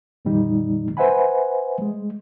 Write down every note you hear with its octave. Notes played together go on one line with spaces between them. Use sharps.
F2 A#2 D#3 G3 D#4
B4 C5 E5 F#5 G#5 B5
G#3